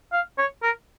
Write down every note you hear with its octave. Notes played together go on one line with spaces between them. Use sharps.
F5
C#5
A#4